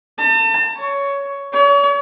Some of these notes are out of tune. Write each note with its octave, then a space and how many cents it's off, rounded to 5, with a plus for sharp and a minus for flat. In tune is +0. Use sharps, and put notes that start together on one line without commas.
A5 +40
C#5 +15
C#5 +40